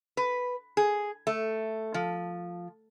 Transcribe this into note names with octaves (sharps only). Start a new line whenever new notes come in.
B4
G#4
A3
F3